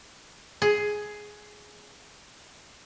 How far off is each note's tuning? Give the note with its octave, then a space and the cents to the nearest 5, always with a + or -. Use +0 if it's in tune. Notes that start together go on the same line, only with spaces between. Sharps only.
G#4 +10